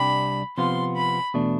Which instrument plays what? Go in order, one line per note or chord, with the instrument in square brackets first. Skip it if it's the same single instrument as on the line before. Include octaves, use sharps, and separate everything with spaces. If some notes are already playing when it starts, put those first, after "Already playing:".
Already playing: [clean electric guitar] C2 C3 G3 D4 G4 [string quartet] B5
[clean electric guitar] C3 F3 B3 F4 [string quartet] C6
[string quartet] B5
[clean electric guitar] E2 B2 A3 D4